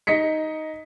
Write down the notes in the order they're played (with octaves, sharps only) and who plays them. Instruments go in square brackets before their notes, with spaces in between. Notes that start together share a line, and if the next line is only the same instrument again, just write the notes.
[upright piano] D#4 D#5 B6 C#7